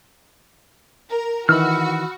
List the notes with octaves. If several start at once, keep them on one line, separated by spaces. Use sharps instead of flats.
A#4
D#3 E3 F#4 B5 E6 F6